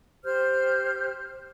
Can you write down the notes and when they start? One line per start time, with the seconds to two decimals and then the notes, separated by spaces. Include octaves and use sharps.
0.24 G4 C5 F6 G6